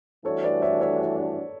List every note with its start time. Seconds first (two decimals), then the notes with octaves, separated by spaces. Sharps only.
0.25 G2 E3 A3 D4 F#4 A4 C#5
0.44 B4 D5
0.62 C#5 E5
0.81 C#5 E5